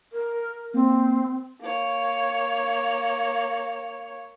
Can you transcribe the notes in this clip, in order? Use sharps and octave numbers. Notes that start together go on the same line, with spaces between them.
A#4
A#3 C4
A#3 C#5